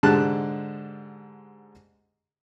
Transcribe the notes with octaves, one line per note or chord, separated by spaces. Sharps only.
G#2 D3 G#3 G4 A5 F#6